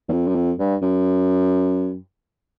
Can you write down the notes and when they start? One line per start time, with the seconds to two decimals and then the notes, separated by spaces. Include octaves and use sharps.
0.08 E2
0.12 F2
0.27 F#2
0.35 F2
0.59 G2
0.82 F#2